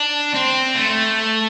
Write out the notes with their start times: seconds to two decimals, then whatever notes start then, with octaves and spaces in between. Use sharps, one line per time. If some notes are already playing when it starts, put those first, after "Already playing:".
Already playing: D4
0.34 C4
0.75 A3